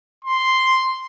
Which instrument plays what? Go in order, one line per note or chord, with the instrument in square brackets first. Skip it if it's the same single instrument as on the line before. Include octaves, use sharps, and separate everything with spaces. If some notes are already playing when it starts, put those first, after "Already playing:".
[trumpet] C6